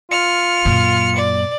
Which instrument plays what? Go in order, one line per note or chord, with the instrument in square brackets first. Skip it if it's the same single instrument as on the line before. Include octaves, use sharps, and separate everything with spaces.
[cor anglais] F4 [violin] F6 [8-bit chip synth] C#7
[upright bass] F#2 A#2
[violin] D5